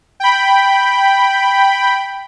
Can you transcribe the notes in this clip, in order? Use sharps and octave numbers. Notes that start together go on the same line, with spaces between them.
G5 B5